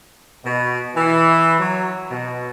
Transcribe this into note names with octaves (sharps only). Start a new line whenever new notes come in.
B2
E3
F#3
B2